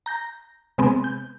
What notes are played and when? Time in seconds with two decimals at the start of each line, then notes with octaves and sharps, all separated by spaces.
0.06 A#5 G6 A#6
0.78 C3 G#3 B3 C4
1.04 G6